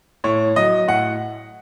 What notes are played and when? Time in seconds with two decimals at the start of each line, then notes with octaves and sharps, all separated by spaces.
0.24 A2 C#5
0.56 F#3 D#5
0.88 A2 F#5